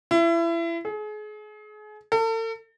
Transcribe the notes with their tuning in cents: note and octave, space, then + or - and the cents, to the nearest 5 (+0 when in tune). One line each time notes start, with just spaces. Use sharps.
E4 +30
G#4 +35
A4 +40